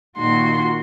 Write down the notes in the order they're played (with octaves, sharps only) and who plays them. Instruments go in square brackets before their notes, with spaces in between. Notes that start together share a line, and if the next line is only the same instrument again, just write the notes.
[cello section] A#2 D#3 F#4 [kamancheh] C6